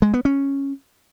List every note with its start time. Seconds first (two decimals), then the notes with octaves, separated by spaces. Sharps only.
0.02 G#3
0.14 B3
0.25 C#4